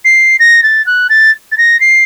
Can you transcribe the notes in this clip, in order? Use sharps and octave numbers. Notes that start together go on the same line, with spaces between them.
C7
A#6
A6
F#6
A6
A6
A#6
C7